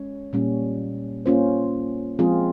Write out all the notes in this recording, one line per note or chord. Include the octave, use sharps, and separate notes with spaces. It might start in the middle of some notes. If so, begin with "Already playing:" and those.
Already playing: G#3 C#4 C#5
A#2 G3 A#3 C#4
A#3 C#4 F4 C5
F3 G#3 C4 F4 G#4